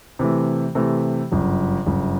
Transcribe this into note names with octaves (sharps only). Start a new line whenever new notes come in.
C3 E3 A3
C3 E3 A3
G1 F#2 C#3
G1 F#2 C#3